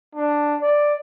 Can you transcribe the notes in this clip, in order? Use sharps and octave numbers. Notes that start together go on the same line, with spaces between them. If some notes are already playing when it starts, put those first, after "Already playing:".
D4
D5